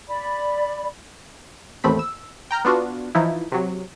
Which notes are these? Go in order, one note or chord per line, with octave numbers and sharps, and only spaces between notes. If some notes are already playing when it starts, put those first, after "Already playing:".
D5 B5
A1 D#2 A3 C4 B5
E6
G5 A#5 F6 G6
B3 D4 F4 F#4
E3 F3 D#4 E4
C3 F#3